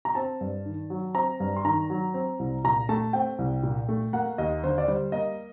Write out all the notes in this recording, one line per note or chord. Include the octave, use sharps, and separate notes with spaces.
A#5
C4 A5
G2
D#3
F#3
C4 A#5
G2
C6
D#3 A#5
F#3
C4
C2
A#2 A#5
A3 A5
C4 G5
C2
A#2
A3
A#3 F#5
D#2 D#5
D3 C5
D5
G3 C5
A#3 D#5